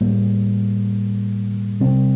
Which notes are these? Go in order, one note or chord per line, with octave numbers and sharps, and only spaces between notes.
A2 G3 A#3
C3 G3 C4